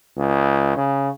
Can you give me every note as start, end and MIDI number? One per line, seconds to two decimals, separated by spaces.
0.17 0.72 37
0.77 1.09 49